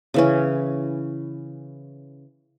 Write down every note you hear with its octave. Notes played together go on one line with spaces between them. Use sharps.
C#3 E3 C#4